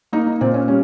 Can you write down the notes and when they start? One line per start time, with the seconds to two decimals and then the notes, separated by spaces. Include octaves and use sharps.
0.13 A#3 D#4
0.27 D#4
0.41 A#2 C4
0.54 C#4
0.68 G3 C#4